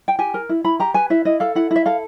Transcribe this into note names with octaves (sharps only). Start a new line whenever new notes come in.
G5
G4 G#5
A#4
E4
E4 B5
G4 A#5
B4 G#5
E4 E5
E4 D#5
A4 F5
E4 F#5
E4
E5
A4 F5